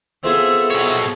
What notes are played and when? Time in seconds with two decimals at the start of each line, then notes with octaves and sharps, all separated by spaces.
0.24 B3 C4 F4 G#4 A4 E5
0.71 B2 C#5